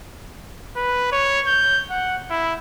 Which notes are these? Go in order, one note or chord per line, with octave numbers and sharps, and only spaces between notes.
B4
C#5
G6
F#5
E4